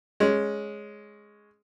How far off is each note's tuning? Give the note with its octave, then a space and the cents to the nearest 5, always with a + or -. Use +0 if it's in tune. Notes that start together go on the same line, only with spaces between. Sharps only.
G#3 +5 C#4 +0